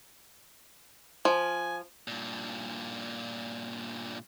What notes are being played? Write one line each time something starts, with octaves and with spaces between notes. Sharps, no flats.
F3 G#5
G2 A#2